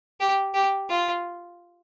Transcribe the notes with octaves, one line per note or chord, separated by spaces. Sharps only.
G4
G4
F4